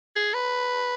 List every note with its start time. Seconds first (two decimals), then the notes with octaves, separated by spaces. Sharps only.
0.16 G#4
0.34 B4